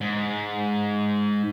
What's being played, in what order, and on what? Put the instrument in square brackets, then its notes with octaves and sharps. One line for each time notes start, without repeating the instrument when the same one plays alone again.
[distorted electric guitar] G#2